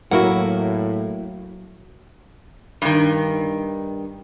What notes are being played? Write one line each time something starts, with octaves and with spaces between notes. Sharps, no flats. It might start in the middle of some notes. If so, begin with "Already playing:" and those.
A2 F#3 A#3 E4 F#4 A#4 F#5
G2 D#3